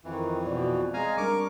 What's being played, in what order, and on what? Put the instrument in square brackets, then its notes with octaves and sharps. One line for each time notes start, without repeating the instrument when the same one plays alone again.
[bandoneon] F2 E3 [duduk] D#3
[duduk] B2 [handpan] C4 D5
[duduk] G#3 [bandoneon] F5 G#5 A#5
[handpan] G3 D4 [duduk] A#4 [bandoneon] C#6 D6